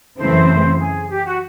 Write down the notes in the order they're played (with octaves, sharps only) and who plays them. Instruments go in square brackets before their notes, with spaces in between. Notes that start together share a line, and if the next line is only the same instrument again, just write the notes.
[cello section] F#2 C#3 E3 A3 C4 [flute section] C5
[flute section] G#4
G4
F#4